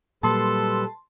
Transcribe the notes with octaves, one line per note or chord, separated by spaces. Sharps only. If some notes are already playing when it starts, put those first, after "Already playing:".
A#2 F#3 G3 A#3 A4 B4 A5 C6